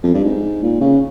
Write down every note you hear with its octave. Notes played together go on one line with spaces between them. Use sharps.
F2
G2
G#2
A#2
C#3